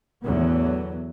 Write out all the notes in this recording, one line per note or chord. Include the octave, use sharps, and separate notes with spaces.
E2 A2 D3 E3 F#3 B3